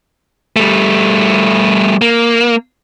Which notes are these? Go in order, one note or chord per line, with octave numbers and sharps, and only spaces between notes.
G3 A3
A#3